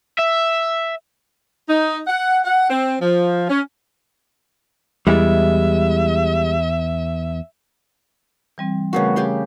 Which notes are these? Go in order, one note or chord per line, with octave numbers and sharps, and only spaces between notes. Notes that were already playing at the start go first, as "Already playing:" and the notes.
E5
D#4
F#5
F#5
C4
F3
C#4
E2 G3 G#3 E4 E5
E3 G3 C4
C#3 G3 A3 B3 F#4 A#4
C#3 G4 C6